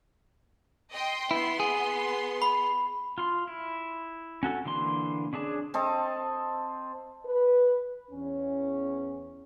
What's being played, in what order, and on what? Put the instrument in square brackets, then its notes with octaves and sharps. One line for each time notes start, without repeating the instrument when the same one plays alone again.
[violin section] D#5 G5 C6
[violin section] B3 C6 [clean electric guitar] E4
[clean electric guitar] G#4
[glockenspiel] B5
[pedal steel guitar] F4 C6
E4
C#4 F#4 A4
D3 E3 A#3 C6
C#4 D4 G#4 A5
[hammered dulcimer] C4 A4 D#5
[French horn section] B4
E2 C#4